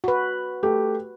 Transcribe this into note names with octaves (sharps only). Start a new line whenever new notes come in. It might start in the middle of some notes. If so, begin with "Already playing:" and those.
F#4 B4
A3 G4